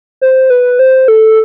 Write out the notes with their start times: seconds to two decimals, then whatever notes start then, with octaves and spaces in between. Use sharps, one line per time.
0.21 C5
0.50 B4
0.79 C5
1.08 A4